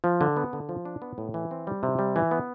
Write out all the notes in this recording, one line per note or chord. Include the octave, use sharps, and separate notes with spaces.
F3
D3
B3
D3
F3
D4
B3
A2
E3
C4
G3
C3
G3
E3
B3